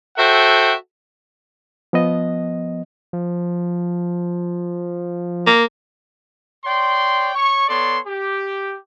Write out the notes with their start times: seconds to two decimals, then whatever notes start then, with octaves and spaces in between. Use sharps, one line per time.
0.18 F#4 A4 C5 E5 F#5 G5
1.93 F3 B3 D#5
3.13 F3
5.46 A#3
6.64 C#5 D5 G5 C6
7.34 C#5 C#6
7.68 B3 A4 C#5 D5 C6
8.06 G4